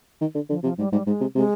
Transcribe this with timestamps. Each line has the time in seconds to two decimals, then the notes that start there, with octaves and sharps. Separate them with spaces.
0.21 D#3
0.35 D3
0.50 D3 F3
0.63 C3 F3
0.78 G#2 G3
0.93 G#2 G3
1.07 G#2 G#3
1.21 C3
1.35 C3 G#3